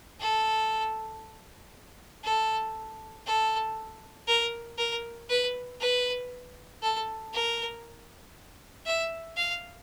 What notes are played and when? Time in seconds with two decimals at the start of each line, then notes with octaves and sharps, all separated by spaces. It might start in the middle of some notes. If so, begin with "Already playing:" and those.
0.20 A4
2.24 A4
3.26 A4
4.27 A#4
4.78 A#4
5.29 B4
5.80 B4
6.82 A4
7.33 A#4
8.86 E5
9.37 F5